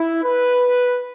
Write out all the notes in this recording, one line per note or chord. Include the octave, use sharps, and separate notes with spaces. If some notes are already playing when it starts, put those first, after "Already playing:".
Already playing: E4
B4